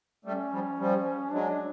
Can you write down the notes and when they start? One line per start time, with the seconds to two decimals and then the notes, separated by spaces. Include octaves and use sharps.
0.25 G3 A3 C#4
0.51 F3 G3
0.79 F3 G3
1.31 F#3 G#3 D4